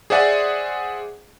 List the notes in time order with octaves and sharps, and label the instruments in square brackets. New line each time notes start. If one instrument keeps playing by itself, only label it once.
[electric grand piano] G#4 C5 D5 E5 F#5 G#5